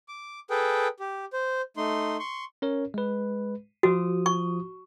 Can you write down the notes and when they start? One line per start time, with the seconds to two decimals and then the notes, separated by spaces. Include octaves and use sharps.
0.08 D6
0.50 G#4 A4 B4 G5
1.00 G4
1.33 C5
1.77 A3 D#4 C6
2.19 C6 C#6
2.62 C#4 A#4 C#5
2.94 G#3 B4
3.83 F3 F4 F#4 D#6
4.26 C#6